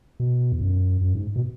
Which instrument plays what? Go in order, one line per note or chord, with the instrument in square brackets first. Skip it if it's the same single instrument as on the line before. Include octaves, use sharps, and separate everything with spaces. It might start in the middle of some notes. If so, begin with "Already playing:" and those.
[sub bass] B2
E2
F#2
F#2
G#2
B2